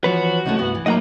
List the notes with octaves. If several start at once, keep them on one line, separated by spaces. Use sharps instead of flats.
E3 F3 B3 F#4 B4 C#5
C2 A3 C#4 D#4
G2 B3
E3
A2 F#3 A#3 D#4 D#5 F#5 A#5